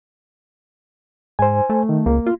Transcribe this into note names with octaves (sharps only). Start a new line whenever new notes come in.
G#2 C5 G#5
A3
D#3
C#2 A#3
F4